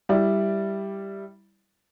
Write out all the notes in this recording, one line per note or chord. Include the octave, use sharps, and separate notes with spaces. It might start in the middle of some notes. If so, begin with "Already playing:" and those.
G3 E4 D5